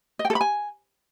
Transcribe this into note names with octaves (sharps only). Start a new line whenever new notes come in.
D#5
G5
A4
B5
G#5